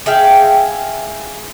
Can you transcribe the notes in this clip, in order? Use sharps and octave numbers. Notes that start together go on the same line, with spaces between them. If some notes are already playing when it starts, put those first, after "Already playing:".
G#4 E5 F5 G5